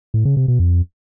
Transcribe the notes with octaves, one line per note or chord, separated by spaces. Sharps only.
A2
C#3
C3
B2
F2